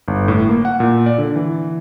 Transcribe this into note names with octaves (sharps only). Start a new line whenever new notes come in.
G1
A2
A#3
F#5
A#2
D5
D3
E3